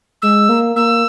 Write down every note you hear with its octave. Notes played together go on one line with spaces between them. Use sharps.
G#3 E6
A#3
A#3 E6